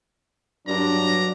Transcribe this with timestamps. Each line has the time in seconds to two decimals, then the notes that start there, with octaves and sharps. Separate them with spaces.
0.67 G2 F#3 D4 A#5